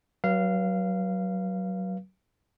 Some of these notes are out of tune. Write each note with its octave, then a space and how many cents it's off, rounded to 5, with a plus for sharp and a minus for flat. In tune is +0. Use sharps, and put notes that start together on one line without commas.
F#3 +20 B4 -35 F5 -20